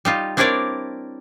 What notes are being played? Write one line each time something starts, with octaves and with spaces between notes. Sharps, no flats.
G3 D#4 F4
C4 D4 E4 A#4 C#5 D5